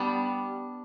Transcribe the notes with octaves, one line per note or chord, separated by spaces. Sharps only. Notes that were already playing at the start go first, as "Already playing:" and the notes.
Already playing: G3 B3 D4